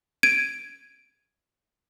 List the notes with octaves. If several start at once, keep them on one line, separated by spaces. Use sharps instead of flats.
G#6 D7 D#7